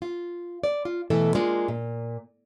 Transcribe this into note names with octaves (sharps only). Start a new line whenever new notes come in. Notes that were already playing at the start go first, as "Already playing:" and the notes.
F4
D5
F4
B2 E3 A3 A4
G#3 A#3 D4 F4
A#2